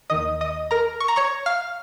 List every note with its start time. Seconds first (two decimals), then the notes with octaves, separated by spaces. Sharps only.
0.10 D#2 D#3 D#5 D#6
0.41 D#5 D#6
0.71 A#4 A#5
1.00 C#6
1.08 A#5
1.16 C#5 C#6
1.46 F5 F6